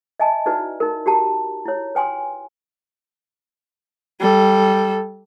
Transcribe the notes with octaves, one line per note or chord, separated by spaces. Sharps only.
D#5 E5 G#5 A5
D#4 E4 F#4 B4 D5
D#4 A#4
F#4 G4 A5 A#5
E4 C#5
B4 G5 G#5 C6
G3 A4